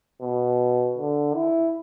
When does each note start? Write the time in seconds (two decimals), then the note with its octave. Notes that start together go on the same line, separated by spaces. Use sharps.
0.22 B2
0.98 D3
1.35 E4